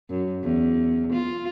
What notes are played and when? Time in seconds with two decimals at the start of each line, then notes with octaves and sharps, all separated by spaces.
0.10 F#2
0.43 E2
1.13 F4